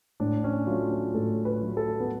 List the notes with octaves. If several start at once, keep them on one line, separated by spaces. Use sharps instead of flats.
A2 D4
C#4
F#3 A3 F4
C#4
A2 A4
B4
F#3 A3
A4
B3